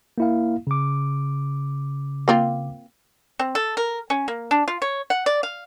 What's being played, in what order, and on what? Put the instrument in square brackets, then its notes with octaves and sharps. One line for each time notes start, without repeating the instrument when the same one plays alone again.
[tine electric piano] A#3 E4 F5
C#3 D6
[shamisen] A#3 C4 F4
[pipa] C4
A4
A#4
C#4
A#3
D4
F4
C#5
F#5
D5
F5